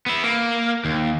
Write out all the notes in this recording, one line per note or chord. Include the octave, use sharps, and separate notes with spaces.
B3 E4
A#3
D#2